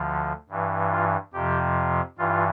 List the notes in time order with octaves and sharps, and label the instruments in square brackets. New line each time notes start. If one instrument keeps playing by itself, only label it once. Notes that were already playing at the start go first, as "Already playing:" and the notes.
Already playing: [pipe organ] D2 D3 F3
G2 E3
F4
F2 C3 F3 G4
G2 E3 F4